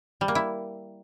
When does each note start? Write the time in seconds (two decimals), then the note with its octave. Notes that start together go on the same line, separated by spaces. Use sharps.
0.21 G3
0.28 A#3
0.35 E4